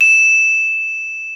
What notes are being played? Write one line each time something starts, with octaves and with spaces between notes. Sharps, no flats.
E7